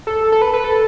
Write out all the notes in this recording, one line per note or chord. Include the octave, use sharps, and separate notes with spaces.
A4
A4
B4
B4
A4